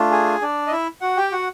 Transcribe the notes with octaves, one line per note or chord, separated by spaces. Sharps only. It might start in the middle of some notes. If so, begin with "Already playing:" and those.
Already playing: A3 D4 F4
G#4 G#5
D4 D5
D#5
E4 E5
F#4 F#5
G4 G5
F#4 F#5